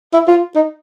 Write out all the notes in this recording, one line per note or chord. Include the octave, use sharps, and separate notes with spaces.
E4
F4
D#4